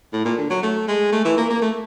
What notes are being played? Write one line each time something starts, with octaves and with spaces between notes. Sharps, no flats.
A2
A#2
D3
F#3
A3
G#3
A3
E3
A#3
A#3
A3